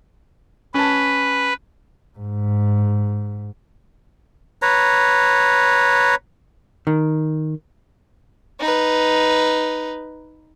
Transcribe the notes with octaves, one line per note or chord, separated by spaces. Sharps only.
C#4 B4 A5
G#2
B4 C#5 A#5
D#3
D#4 B4